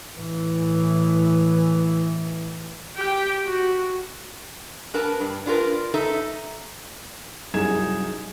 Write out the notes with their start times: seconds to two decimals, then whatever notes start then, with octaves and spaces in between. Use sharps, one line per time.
0.17 A2 E3
2.95 G4 G5
3.45 F#4
4.94 D4 A#4 B4 A5
5.20 G2
5.46 D4 F4 G4 A#4 B4
5.94 D#4 A4 E5
7.54 C2 F#2 D#4 G#4 G#6 E7